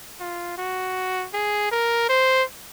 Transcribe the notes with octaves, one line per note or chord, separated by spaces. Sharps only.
F4
F#4
G#4
A#4
C5